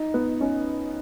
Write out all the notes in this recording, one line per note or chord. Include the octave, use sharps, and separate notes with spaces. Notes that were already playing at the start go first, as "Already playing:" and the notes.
Already playing: D#4
B3
C#4